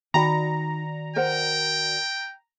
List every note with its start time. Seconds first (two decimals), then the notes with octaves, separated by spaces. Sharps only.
0.14 D#3 D#4 F#4 D5 G5 A#5 B5
1.16 A#4 C5 F#5 G5